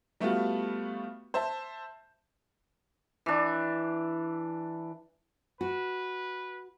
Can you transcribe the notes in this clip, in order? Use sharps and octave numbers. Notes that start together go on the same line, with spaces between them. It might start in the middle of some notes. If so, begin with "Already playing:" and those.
G3 A3 B3 F4 F#4
C5 E5 A5
E3 D4
F#4 B4